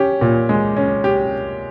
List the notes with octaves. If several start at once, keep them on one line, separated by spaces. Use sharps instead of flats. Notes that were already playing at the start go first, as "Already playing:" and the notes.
Already playing: C#4 G4
A#2
G#3
C#4
G4